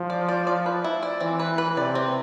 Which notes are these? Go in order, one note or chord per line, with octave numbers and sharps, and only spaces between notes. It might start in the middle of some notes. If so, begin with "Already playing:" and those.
Already playing: F3
D5
D5
D5
B4
E4
D5
E3 C4
B4
B4
C3 D5
C4